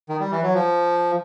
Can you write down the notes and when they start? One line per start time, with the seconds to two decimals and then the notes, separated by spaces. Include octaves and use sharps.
0.09 D#3
0.20 G3
0.32 E3
0.43 F#3
0.54 F3